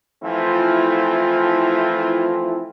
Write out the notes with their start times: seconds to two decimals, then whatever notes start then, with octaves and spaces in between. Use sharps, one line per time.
0.23 E3 F3 A3 C4 E4 F4